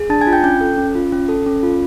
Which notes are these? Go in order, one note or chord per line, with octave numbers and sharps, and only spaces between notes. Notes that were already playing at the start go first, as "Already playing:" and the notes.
Already playing: G#4
D4 A5 A6
G#5 G#6
F4
G5 G6
C#4 G5 G6
A4
C#4
F4
C#4
A4
C#4
F4